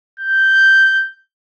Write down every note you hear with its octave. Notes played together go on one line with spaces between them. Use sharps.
G6